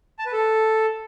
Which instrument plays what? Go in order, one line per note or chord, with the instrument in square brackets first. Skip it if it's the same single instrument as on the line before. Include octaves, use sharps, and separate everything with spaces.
[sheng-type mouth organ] A5
B4
A4